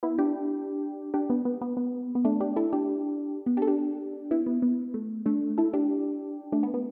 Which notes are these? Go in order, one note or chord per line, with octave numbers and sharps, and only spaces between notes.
B3 E4
D4 G4
D4 G4
B3
B3
B3
B3
B3
A3 D4
D4 G4
E4 A4
D4 G4
B3
D4 G4
A4
D4 G4
B3 E4
B3
B3
A3
A3 D4
E4 A4
D4 G4
A3 D4
B3
B3